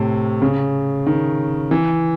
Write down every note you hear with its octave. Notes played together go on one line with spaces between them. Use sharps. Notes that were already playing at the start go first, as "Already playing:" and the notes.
Already playing: A2 C3
C#3
D#3
E3